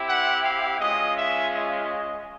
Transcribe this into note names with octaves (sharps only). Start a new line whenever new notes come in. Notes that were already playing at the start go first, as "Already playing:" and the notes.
Already playing: C4 E4 G4
F#5
F5
G#3 C#4 F4 D#5
E5
D#5